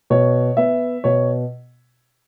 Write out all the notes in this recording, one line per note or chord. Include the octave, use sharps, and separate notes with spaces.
B2 C#5
B3 E5
B2 C#5